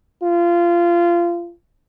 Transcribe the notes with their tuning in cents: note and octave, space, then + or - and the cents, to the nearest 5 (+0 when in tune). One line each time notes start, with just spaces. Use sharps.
F4 -20